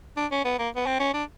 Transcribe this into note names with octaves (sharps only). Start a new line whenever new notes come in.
D4
C#4
B3
A#3
B3
C4
C#4
D4